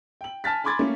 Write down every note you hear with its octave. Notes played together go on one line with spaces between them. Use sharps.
G5 F#7
G#5 A5 F6 A6 B6
G#5 B5 C6 D6 G#6 A6
A3 A#3 C#4